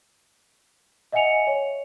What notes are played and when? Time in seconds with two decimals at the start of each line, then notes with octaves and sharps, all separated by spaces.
1.12 D#5 E5 F#5 G#5 C#7 F7
1.47 C#5